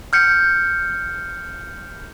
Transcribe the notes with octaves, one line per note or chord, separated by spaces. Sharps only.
F6 G6 C#7